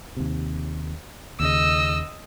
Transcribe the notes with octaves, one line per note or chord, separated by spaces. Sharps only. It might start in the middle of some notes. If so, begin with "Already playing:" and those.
D#2 C3
D#2 C#3 D#5 E6